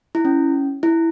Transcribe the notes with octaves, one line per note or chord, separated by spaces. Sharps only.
E4
C#4
E4